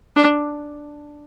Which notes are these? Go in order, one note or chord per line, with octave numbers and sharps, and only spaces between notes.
D4